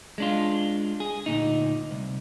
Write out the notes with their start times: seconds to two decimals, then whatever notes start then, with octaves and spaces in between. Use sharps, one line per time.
0.18 G#3 D4 F4
1.00 G#4
1.26 D2 A#2 D#4
1.91 C2